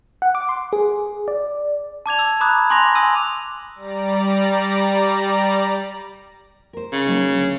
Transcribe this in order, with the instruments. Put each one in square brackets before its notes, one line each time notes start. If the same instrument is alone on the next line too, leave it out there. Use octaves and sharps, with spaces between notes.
[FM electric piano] F#5
D6
C6
G#4
D5
[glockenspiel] A5 D6 G#6 F7
E6
A#5 B5 D6 D#6 F#6 F7
G#5 C6 D6 F#6 A#6 F7
G#5 C6 D#6 E6 D#7
[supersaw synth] G3 D5 A#5
[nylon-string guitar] A#4 C5
[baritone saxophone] C#3
[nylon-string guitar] F#3 A#3 D#4
D2